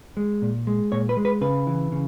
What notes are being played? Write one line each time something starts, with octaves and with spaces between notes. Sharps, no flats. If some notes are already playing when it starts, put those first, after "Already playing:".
G#3
A#2
G#3
A#2 C#5
B4
G#3
B4
C#3 B4
E3
C#3